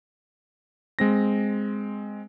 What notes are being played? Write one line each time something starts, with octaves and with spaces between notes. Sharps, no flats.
G#3 C4 A#6